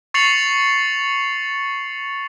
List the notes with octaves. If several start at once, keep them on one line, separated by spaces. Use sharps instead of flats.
C#6 A6 C7 C#7 F7 F#7